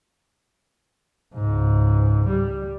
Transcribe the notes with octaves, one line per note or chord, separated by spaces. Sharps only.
C#2 G#2
G3